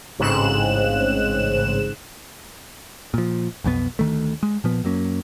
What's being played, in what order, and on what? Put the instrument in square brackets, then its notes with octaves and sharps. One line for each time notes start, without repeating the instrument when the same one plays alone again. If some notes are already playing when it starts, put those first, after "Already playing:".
[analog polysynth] A1 G#2 C#3 C4 F#6 E7
[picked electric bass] A#2 F3
B1 F2 B2 B3
D2 D#3 A3
G#3
A#2 F3 B3
F#2 F#3 A#3 C#4